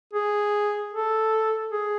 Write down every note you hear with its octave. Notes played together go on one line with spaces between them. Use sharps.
G#4
A4
G#4